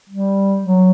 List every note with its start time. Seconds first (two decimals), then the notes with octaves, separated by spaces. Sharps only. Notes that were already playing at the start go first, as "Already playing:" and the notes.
0.10 G3
0.61 F#3